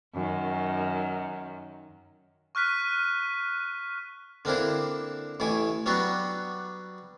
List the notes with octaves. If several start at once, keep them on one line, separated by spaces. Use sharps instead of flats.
F#2 D#3
C#6 F6 F#6 B6 D#7
D3 A#3 C4 D4 E4
A1 A2 E4 G#5
F#3 G3 B3 D4 F#4